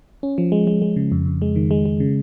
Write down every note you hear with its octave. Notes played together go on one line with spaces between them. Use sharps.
C#4
F3
G#3
G#3
G#3
C#3
F2
F2
G#3
D#3
G#3
G#3
C#3